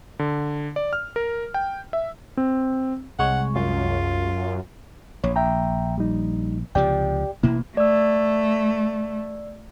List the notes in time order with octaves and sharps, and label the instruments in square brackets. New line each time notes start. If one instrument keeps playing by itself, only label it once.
[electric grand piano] D3
D5
F6
A#4
G5
E5
C4
[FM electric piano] C2 G#3 C#5 [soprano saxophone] F#5
[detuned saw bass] F#2 [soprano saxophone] F4
[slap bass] A#1 [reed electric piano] C#5
[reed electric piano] E5 G5 A#5
G3 D#4
[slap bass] C#2 C3 F3 [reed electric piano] G4 D5 G5
[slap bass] A1 B2 A#3 [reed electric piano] E4
[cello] A3 [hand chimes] D5 E6